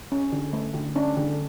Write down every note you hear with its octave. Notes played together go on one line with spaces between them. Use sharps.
C#4
D3
A3
D3
C#4 D4
D3